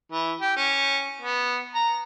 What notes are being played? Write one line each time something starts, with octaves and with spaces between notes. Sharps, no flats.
E3
G4
C#4
B3
A#5